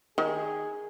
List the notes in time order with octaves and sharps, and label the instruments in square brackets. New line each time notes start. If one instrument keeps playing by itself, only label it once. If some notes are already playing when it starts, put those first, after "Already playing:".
[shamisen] D#3 [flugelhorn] G#4